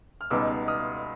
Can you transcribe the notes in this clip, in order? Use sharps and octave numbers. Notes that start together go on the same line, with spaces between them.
F6
C#2 B2 G3 B3 D#4 D6 E6
D#6 F6